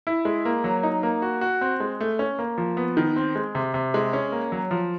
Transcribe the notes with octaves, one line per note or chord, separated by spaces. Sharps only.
E4
G#3
A#3
F#3
D#4
A#3
F#4
F#4
C4
G#3
A3
C#4
A#3
F3
B3
D#3
C4
G#3
C3
C3
G#3
C#4
A#3
F#3
F3